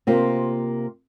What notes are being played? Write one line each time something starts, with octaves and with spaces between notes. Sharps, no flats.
C3 A#3 F4 C5